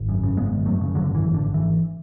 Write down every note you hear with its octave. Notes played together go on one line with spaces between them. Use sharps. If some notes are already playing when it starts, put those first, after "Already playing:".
Already playing: G#1
F#2
C#3
G#1 G#3 B3
G#1
F#2 F#3 A3
C#3
F#2 D3 F#3
G#1
E3
G#1
D3
G#1
E3